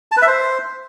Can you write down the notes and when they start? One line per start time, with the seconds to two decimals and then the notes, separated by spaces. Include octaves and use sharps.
0.12 A5
0.17 B4
0.22 E5
0.27 C5